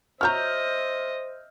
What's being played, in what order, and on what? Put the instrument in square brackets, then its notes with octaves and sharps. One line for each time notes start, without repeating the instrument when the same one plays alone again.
[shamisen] F#4 C#5 A#5 [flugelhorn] C5 [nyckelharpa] D#5 E5 [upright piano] F6 G6